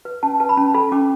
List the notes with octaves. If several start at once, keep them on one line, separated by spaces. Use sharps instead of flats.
B4
C#4 A5
B4 A5
B5
C#4 A5
A4 B5
C#4 D6